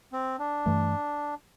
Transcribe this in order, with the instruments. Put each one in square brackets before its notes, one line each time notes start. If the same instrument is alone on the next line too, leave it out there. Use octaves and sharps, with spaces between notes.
[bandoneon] C4
D4
[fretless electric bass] G2 E3 A3